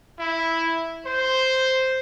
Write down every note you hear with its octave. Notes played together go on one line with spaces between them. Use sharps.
E4
C5